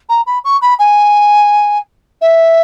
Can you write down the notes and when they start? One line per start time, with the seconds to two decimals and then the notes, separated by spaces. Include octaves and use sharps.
0.09 A#5
0.26 B5
0.44 C#6
0.61 B5
0.79 G#5
2.21 E5